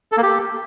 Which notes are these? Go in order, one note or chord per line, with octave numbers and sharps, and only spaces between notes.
A4
A#3
G4